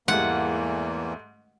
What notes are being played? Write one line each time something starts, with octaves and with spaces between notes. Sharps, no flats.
E2 G#2 E3 G3 A3 A#3 F#5